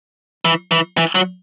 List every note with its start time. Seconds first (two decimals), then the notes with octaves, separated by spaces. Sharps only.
0.45 E3
0.71 E3
0.98 E3
1.15 F#3